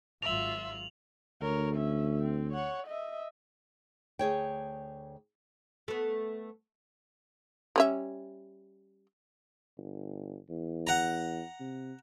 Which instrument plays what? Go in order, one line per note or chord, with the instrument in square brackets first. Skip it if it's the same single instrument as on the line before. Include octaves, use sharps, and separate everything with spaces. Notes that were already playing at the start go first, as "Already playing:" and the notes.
[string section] G#1 F#3 F4 [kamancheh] E5 [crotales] F7 F#7
[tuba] D2 [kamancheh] A#4 C#5
[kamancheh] C#4 E5
C4
C#5 F#5
D#5 E5
[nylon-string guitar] D2 G#4 C#5 G5
[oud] A3 B3
[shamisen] G3 C#4 E5
[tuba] G1
E2
[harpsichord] F#5 A#5
[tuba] C3